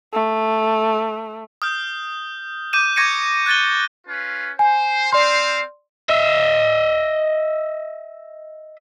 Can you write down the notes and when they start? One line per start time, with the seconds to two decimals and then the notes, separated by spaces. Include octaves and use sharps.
0.13 A3
1.62 D#6 F6 G6
2.73 D6 G6 D#7 E7
2.96 C#6 D6 G#6 A#6 C#7 D#7
3.46 F#6 G#6 A6 D#7 G7
4.07 C#4 F4 B4
4.59 C5 G#5
5.13 C4 C5 D5 F5 C6
6.09 D#5 E5